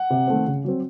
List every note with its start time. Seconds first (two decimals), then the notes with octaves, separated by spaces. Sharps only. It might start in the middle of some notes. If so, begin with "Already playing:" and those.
Already playing: F#5
0.10 C3
0.27 D#3 A3 C4
0.46 C#3
0.65 F#3 C4